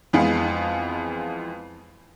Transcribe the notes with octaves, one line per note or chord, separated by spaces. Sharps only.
F2 E3 G#3 B3 F5